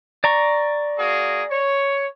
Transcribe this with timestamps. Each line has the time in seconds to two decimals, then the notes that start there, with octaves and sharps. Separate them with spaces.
0.24 D5 A#5 C#6
0.98 A#3 F#4 G#4
1.50 C#5